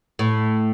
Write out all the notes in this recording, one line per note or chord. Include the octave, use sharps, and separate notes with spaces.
A2